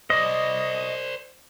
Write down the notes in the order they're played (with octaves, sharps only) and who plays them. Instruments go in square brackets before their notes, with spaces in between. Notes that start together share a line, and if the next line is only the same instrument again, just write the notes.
[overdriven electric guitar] C5 D5 [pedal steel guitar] D#5